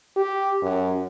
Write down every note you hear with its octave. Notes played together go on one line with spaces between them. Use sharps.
G4
F#2